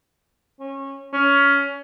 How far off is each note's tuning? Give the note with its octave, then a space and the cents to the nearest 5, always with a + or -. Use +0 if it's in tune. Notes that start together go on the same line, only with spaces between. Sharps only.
C#4 -20
C#4 +20